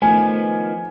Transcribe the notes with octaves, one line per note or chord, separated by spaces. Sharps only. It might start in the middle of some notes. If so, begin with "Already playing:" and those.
D#3 F3 A3 B3 G#5